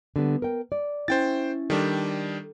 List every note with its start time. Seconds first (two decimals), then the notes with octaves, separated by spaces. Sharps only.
0.16 D3 G3 B3
0.42 A#4 G5
0.72 D5
1.08 C#4 E4 C5 G5 A6
1.70 D#3 G3 D4 A4